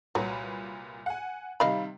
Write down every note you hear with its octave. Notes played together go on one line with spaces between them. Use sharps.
C2 A#2 F#3 B4
F#5 G#5
C3 D#3 G3 D#5 F5 B5